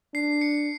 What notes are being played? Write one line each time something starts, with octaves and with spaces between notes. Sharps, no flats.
D4 C7
C#7